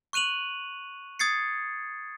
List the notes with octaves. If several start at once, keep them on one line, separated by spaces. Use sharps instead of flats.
C#6 F#6 D#7 F7 F#7
D#6 G#6 A6 C7 C#7